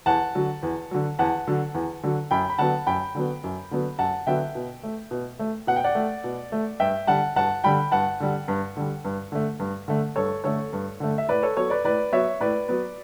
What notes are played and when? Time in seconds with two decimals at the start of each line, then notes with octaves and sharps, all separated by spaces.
0.06 E2 F#5 A5
0.35 D3 F#3
0.63 E2
0.91 D3 F#3
1.19 E2 F#5 A5
1.47 D3 F#3
1.74 E2
2.03 D3 F#3
2.31 F#2 G5 B5
2.50 B5
2.58 D3 F#3 B3 F#5 A5
2.87 F#2 G5 B5
3.15 D3 F#3 B3
3.44 F#2
3.71 D3 F#3 B3
3.99 F#2 F#5 A5
4.27 D3 F#3 B3 E5 G5
4.55 B2
4.83 A3
5.11 B2
5.39 A3
5.67 B2 F#5
5.76 G5
5.84 D5 F#5
5.95 A3
6.24 B2
6.52 A3
6.80 G2 E5 G5
7.07 D3 G3 F#5 A5
7.36 G2 F#5 A5
7.64 D3 G3 G5 B5
7.92 G2 F#5 A5
8.20 D3 G3
8.48 G2
8.77 D3 G3
9.04 G2
9.32 D3 A3
9.60 G2
9.88 D3 A3
10.16 G2 A4 C#5
10.44 D3 A3 A4 C#5
10.73 G2
11.00 D3 A3
11.18 E5
11.29 A2 B4 D5
11.43 A4 C#5
11.57 F#3 B3 A4 C#5
11.70 B4 D5
11.85 A2 B4 D5
12.12 F#3 B3 C#5 E5
12.40 A2 B4 D5
12.68 F#3 B3